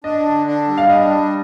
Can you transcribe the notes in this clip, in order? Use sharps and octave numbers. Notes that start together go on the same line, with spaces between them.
D4 D#5
D3
D4
G3
F5
D4 D#5
G3